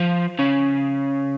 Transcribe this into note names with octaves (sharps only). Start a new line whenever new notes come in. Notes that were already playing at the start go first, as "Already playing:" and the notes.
Already playing: F3
C#3